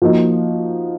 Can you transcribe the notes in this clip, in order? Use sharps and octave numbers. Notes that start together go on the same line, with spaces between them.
F3 A#3 D#4 F#4